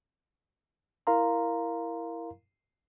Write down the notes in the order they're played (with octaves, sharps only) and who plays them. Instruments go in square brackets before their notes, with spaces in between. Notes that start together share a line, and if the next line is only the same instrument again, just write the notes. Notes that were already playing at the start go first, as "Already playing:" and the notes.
[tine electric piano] E4 A#4 F5 A#5 C6